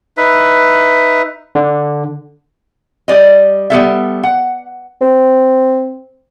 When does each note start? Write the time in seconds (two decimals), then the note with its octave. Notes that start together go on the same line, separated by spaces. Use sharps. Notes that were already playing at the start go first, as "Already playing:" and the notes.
0.17 D#4 B4 E5
1.55 D3
3.08 G3 D5 D#5
3.70 G3 B3 A4 E5
4.23 F#5
5.01 C4